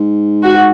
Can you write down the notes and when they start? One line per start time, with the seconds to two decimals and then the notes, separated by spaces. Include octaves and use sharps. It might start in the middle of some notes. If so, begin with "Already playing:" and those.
Already playing: G#2
0.43 F#4